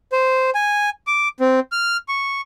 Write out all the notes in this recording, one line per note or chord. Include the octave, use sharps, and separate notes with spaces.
C5
G#5
D6
C4
F6
C#6